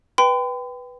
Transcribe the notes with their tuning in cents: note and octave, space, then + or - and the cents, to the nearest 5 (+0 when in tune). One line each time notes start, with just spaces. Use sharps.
B4 +0 G5 +0 B5 +45